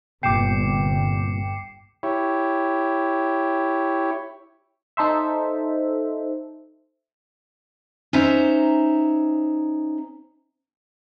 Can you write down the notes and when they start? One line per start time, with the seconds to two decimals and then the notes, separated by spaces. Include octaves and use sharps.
0.23 G1 C2 A#2 G5 D6 C7 C#7 E7
2.03 E4 G4 C#5
4.97 D#4 A4 C5 E5
8.13 C#4 D#4 C5 E5 A#5